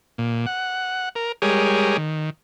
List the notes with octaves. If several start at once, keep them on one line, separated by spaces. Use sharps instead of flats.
A#2
F#5
A#4
G3 G#3 G4 G#4 A#4 C#5
D#3